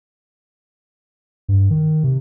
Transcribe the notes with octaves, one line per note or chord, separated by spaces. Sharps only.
G2
D#3
C3